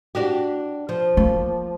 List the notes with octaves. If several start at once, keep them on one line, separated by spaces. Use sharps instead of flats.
D4 F#4 G4
F3
A#3